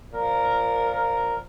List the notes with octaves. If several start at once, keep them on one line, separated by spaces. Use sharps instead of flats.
A#2 F3 A#4
A#4